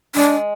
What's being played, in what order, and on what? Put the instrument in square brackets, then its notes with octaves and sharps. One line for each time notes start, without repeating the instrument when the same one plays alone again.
[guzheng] G#3 [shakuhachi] D4